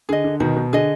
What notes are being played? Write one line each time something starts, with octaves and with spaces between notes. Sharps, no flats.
D3 G#4 D#5
D3
B2 D#3 D#4
B2
D3 G#4 D#5